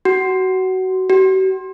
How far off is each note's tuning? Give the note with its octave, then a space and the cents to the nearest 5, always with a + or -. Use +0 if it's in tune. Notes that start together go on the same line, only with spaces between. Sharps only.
F#4 +20
F#4 +45